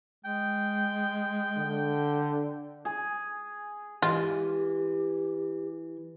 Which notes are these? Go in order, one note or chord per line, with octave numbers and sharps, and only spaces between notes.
G#3 G5
D3
G#4
E3 G#3 F4 G4